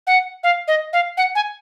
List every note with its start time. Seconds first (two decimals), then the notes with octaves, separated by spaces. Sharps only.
0.07 F#5
0.43 F5
0.68 D#5
0.93 F5
1.17 F#5
1.35 G#5